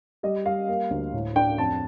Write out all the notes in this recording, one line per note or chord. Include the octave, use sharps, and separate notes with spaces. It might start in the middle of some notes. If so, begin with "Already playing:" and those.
G3 D#5
G3 F5
A#3
D2
A2
D4 G5
F2 A5